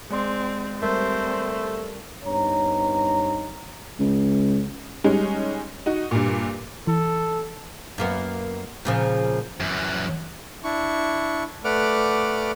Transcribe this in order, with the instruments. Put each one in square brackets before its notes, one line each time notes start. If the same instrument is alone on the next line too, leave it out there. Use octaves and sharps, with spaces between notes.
[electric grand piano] G#3 D5 C6 [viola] C4
[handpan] G3 A4 A#4 [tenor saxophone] A3 [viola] C4 C5
[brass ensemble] G2 B3 C4 D#4 C#5 A#5
[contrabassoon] C#2
[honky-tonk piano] G3 G#3 C#4 D#4
D#4 F#4
G2 A#2
[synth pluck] E3 [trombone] A4
[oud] F#2 A#3 B3
A#2 C#3 F3
[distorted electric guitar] F#2 E3
[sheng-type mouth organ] D4 E4 C#6
A3 B4 D5 F#5 D6 F6